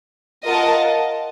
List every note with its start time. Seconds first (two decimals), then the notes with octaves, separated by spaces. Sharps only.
0.47 F4 A#4 D#5 F#5 A5